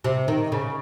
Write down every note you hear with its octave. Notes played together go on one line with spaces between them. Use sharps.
C3
D#3
C#3